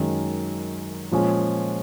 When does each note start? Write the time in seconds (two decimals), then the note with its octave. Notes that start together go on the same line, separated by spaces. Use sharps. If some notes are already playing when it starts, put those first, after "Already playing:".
Already playing: F#2 D#3 G#3
1.12 A#2 F3 G#3 C#4 G#4